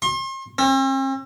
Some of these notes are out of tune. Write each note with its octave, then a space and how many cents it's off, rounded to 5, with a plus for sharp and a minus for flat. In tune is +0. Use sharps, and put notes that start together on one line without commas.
C6 +40
C4 +45